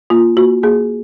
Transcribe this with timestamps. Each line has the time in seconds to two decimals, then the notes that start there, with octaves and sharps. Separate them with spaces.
0.10 A#3 F4
0.37 A#3 F#4
0.63 A#3 G#4